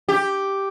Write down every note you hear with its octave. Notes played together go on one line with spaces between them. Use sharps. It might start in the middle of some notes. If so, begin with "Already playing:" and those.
G4